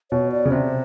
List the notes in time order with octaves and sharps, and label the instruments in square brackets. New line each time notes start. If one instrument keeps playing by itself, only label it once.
[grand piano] B2 [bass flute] C#5
[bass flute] D5
[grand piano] C#3
[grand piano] C3 [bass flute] C5